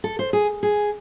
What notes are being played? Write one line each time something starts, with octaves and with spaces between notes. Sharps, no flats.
A4
C5
G#4
G#4